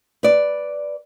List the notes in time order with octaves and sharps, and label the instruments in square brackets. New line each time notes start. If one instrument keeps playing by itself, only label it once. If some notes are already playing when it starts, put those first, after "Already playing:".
[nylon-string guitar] B4 D5